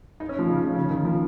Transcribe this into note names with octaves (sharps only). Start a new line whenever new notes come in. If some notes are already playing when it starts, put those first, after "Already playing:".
D#4
C#4
F3
C#3
C#3
D#3
F3